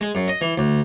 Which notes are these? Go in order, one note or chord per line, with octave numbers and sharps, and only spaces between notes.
G#3
F#2
D#5
E3
D2